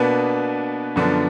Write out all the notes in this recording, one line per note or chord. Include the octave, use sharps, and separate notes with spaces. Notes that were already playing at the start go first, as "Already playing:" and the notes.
Already playing: B2 A#3 B3 D4 B4
F#2 D3 F3 B3 D4